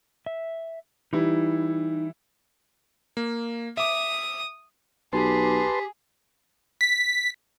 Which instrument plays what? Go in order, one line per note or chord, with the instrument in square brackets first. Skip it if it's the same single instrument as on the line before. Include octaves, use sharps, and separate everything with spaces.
[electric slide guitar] E5
[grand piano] E3 G3 E4 [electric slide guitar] D#4
[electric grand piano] A#3
[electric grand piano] E5 D6 [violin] D#6
[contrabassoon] B1 [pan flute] G4 [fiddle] G#4 [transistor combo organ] B4 A5 C6
[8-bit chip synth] B6